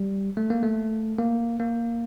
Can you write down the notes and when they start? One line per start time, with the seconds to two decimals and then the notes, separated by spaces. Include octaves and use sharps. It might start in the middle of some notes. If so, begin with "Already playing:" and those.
Already playing: G3
0.37 A3
0.50 A#3
0.63 A3
1.19 A#3
1.60 A#3